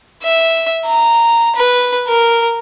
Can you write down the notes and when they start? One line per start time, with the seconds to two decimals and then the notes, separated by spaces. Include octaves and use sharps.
0.23 E5
0.86 A#5
1.55 B4
2.07 A#4